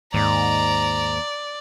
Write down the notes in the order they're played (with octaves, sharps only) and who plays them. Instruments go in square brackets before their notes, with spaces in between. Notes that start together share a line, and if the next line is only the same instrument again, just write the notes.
[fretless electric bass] D#2 [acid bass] G#2 [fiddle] D5 [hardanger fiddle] A#5